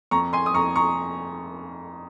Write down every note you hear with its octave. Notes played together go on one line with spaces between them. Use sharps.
F2 A#5 C#6
G#5 C6
D#6
F2 A#5 C#6
A#5 C#6